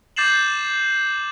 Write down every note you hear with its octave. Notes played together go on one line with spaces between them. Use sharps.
D6 G6 A6 C7 E7 F#7